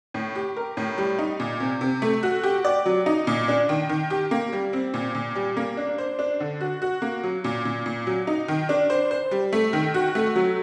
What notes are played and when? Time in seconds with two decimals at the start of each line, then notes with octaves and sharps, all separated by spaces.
0.14 A2
0.35 G4
0.56 A#4
0.77 A2
0.98 G3
1.19 D#4
1.40 A#2
1.60 C3
1.81 C3
2.02 A3
2.23 F#4
2.43 G4
2.65 D5
2.86 F#3
3.06 D#4
3.27 A#2
3.48 D4
3.69 D#3
3.89 D#3
4.10 G4
4.31 A#3
4.52 G3
4.73 C4
4.94 A#2
5.15 A#2
5.35 G3
5.57 A#3
5.77 D4
5.98 C5
6.19 D4
6.40 D3
6.61 F#4
6.82 F#4
7.02 A#3
7.23 F#3
7.44 A#2
7.65 A#2
7.86 A#2
8.07 F#3
8.27 D#4
8.48 D#3
8.69 D4
8.90 C5
9.11 C5
9.31 G3
9.53 A3
9.73 D#3
9.94 F#4
10.15 A3
10.36 F#3